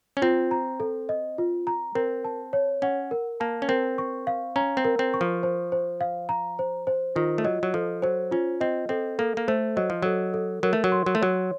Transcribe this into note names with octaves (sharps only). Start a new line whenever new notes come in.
C#4
C4 F4
A#5
A4
D#5
F4
A#5
C4 A#4
A5
C#5
C#4 F#5
A#4
A#3 A5
C#4
C4 A#4
C#6
F5
C#4 A#5
C4
A#4
C4
C#6
F3
C5
C5
F5
A#5
C5
C5
D#3 F4
A3
F#3 D#5
F#3
F3 A4
F#3 C5
C#4 F4
C4 D#5
C4 A4
A#3 A4
A#3
A3 C5
F#3 D#5
F3
F#3 A4
A4
F#3 A#4
A3
F#3
C6
F#3
A3
F#3 C#5